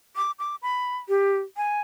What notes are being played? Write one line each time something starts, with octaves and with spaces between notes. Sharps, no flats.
D6
D6
B5
G4
G#5